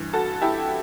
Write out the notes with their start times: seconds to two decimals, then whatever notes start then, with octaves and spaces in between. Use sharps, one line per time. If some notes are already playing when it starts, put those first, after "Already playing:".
Already playing: G2 E3
0.13 F#4 A4
0.42 E4 G4